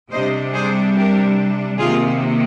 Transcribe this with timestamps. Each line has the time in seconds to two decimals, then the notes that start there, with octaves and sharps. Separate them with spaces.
0.11 C3 G3 D4 C5 D#5
0.53 G#4 C5
0.95 G4 A#4
1.78 C3 D#3 A#3 F4 G#4